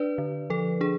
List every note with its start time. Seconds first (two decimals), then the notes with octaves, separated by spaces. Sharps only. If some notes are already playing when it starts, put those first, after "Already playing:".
Already playing: D4 B4 D5
0.18 D3
0.50 F3 A4
0.81 D4 G#4